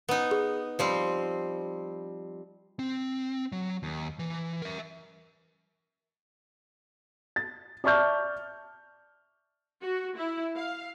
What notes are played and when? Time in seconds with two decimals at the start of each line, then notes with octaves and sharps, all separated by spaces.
0.09 B3 D#4
0.31 G#4
0.79 F3 G3 C4
2.79 C4
3.52 F#3
3.83 D#2
4.19 E3
4.62 A#4 E5
7.36 A6
7.84 D5 E5 A5 C#6 F6 G6
9.82 F#4
10.17 E4
10.57 F5